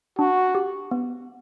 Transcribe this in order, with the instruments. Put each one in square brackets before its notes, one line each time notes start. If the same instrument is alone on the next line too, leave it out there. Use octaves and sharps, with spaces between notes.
[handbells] D4 [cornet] F#4
[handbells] G4
B3